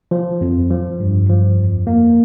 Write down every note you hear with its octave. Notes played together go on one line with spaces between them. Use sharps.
F3
F2
F3
G2
F3
F2
A#3